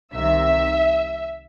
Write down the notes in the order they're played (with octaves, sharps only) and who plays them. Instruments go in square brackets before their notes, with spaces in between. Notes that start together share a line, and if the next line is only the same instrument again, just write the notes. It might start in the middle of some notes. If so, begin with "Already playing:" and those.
[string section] C2 C3 D#3 E5